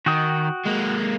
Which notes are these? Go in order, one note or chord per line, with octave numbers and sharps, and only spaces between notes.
D#3 F#4 G5 D#6
G#3 A#3